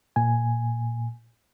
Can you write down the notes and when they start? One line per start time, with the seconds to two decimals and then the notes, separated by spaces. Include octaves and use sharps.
0.16 A#2 G#5